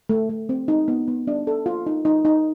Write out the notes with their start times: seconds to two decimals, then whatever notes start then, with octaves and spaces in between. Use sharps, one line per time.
0.09 A3
0.29 A3
0.49 C4
0.68 D#4
0.88 B3
1.08 B3
1.27 D4
1.47 A4
1.66 F4
1.86 D#4
2.05 D#4
2.25 D#4